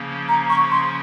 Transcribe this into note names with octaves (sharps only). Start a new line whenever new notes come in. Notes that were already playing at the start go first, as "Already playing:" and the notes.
Already playing: C#3 F3 A#3 C#4
A#5
C#6
C6